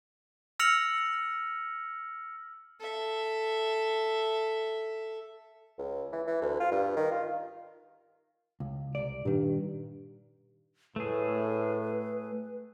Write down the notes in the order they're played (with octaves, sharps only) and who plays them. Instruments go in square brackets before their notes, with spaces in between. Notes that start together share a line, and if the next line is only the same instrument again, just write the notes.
[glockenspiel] E6 F6 A#6 C#7 F7 F#7
[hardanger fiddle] A4 E5
[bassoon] C#2
E3
E3
D2
F4
G2
D#3
F4
[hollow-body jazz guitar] C#2
C2 D5
[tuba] G2 [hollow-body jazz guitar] A#2 D#3
[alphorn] A2 [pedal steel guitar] A3 G#4 [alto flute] B4